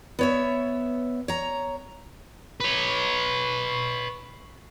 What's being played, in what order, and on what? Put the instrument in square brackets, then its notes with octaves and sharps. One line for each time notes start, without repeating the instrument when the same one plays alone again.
[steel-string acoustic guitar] B3 C#5 E5
C#5 A#5
[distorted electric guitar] B4 C#5